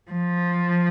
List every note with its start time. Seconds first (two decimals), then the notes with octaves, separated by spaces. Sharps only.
0.11 F3